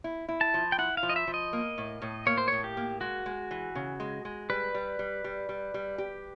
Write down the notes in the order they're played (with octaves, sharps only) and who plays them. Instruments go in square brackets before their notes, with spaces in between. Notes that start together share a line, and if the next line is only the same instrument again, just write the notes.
[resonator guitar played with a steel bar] E4
E4
[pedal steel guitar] A5
[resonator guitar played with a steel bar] F3
[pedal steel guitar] G5
[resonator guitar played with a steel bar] E4 [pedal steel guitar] F#5
[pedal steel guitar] F5
[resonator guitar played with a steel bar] F3
[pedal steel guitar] D#5
E5
[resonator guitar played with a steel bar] F3
[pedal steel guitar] D#5
[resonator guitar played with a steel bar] A#3
A2
A2
[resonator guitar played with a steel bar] A#3 [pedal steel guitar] C#5
[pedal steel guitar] C5
[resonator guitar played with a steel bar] A2 [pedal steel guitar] C#5
[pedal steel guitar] G4
[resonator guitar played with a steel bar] A#3
[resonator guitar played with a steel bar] G#3 [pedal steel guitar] F#4
[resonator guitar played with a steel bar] G#3
E3
C#3
G#3
G#3
[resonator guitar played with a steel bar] G3 [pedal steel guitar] B4
[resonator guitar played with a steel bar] G3
G3
G3
G3
G3
G4